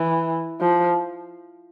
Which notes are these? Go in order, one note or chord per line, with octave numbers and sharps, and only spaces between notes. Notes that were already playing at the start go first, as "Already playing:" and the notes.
Already playing: E3
F3